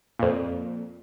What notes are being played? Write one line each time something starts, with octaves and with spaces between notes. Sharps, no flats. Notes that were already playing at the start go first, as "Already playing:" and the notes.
F2 A#2